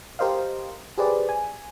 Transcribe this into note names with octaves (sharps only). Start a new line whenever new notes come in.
G4 A#4 C5 D#5 F5
G4 G#4 B4 C5 D5
G#5